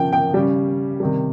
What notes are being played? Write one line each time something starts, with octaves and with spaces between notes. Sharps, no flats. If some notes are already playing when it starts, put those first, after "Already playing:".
Already playing: C#3 F3 G5
G5
C#3 G3
C3 D#3 G3